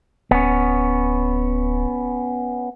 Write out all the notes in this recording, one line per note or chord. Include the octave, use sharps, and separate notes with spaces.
D1 B3 C#4